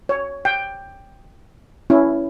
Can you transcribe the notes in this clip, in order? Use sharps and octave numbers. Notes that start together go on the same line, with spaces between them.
C#5
G5
C#4 E4